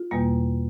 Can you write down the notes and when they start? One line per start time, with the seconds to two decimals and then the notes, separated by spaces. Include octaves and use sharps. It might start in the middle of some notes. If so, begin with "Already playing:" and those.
Already playing: F4
0.11 E2 B2 G3 A#3